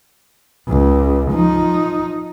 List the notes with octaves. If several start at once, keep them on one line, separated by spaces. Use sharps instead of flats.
C#2
F3 D#4